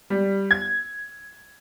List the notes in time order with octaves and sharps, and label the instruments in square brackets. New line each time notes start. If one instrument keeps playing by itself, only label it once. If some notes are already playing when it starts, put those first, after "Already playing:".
[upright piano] G3
G#6